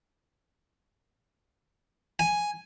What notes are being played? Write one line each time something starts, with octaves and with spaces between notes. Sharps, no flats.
G#5